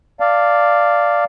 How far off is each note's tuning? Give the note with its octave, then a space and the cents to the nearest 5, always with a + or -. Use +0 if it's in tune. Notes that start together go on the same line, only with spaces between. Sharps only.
D5 +0 F5 -5 A5 +25